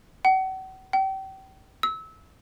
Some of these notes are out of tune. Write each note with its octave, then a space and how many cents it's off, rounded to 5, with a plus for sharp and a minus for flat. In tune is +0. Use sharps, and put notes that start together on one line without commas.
F#5 +40
G5 -30
E6 -25